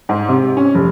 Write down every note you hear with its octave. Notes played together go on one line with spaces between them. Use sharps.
G#2
C3
C#4
F1